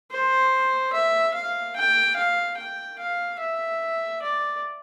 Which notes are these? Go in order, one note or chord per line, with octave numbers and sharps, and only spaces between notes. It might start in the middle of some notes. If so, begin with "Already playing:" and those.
C5
E5
F5
G5
F5
G5
F5
E5
D5